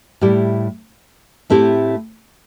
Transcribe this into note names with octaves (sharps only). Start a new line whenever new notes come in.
A2 G3 E4 G4
A2 A3 C4 E4 G4